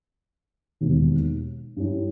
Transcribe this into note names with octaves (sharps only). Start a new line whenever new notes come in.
E1 D#2 D#3
G2 G3 C#4 E4